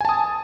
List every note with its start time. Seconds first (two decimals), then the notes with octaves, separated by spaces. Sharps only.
0.01 G#5
0.05 A5
0.09 D#6